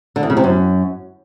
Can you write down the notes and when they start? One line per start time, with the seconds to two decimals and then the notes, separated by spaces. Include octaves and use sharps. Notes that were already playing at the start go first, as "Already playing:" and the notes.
0.16 D3
0.23 E2
0.30 C#3
0.37 C3
0.44 F#2